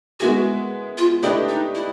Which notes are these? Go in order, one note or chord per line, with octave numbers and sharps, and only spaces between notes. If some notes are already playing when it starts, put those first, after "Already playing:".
G#3 B3 E4 F#4 G#4
F4
A3 D4 E4 G4 B4 D#5
D#4
E4